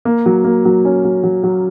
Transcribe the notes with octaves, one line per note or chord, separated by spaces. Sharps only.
A#3
F#3
A#3
F#3
C#4
F#3
F#3
F#3